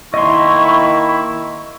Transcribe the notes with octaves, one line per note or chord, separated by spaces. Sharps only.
D#3 A#3 E4 D#5 C6 C#6